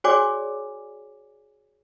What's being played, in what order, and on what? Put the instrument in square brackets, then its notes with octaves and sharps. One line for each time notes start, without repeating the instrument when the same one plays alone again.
[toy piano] F#4 G#4 C#5 D5 G#5 D6